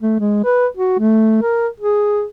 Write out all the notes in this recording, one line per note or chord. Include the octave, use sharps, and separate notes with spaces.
A3
G#3
B4
F#4
A3
A#4
G#4